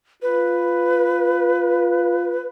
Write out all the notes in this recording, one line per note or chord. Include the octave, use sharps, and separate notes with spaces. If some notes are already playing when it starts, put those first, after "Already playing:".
F4 B4